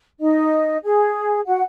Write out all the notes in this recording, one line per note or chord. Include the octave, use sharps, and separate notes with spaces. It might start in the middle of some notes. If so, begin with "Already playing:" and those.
D#4 D#5
G#4
F#4 F#5